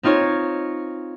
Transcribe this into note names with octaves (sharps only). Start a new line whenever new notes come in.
C4 D#4 F4 C#5